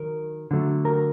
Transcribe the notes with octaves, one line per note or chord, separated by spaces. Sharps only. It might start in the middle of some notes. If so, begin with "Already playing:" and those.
Already playing: D#3 F#3 A#4
D3 F#3 A3
A#4